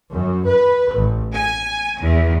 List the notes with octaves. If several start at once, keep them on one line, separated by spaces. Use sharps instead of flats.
F#2
B4
A1
G#5
E2